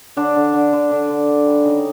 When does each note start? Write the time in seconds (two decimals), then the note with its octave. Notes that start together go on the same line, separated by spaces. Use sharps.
0.17 D3 D4
0.36 D3
0.53 D3
0.73 D3
0.91 D3
1.10 D3
1.28 D3
1.46 G3
1.65 C#3 D#4